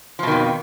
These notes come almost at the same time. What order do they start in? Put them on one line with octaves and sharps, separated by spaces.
F3 B2 D#3 F2